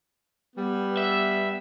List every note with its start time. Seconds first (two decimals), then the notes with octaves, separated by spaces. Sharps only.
0.56 G3 B3
0.97 E5